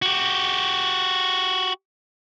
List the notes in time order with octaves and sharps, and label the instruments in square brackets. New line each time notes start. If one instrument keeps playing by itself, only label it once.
[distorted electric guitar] F#4 G4